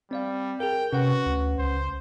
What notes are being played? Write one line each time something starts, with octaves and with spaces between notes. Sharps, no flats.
G3 C4 D5 F5
G#4 A#4 G5
C3 C#4 F#4 B4 F#5
D2
C#2 C5